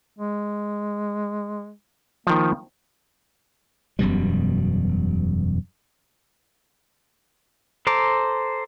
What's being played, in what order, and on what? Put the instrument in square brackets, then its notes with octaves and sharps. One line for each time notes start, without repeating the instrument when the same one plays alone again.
[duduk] G#3
[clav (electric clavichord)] D#3 F3 [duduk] A#3
[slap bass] E1 F#2 B2 G3
[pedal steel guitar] A4 C5 A#5 D6